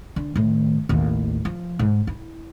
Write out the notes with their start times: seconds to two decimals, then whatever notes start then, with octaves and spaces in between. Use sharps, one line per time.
0.16 D3
0.36 A2 D#3
0.89 A1 D#2
1.45 F3
1.79 G#2
2.07 E4